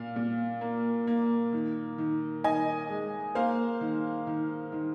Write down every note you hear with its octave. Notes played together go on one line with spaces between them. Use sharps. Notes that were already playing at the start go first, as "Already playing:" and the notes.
Already playing: A#2 F5
A#2
A#3
A#3
D#3
D#3
D#3 D#5 G#5
G#3
A#3 C5 F5
D#3
D#3
D#3